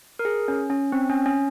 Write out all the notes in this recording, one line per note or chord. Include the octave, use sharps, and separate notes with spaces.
A#4
G#4
C#4
C#4
C4
C#4
C#4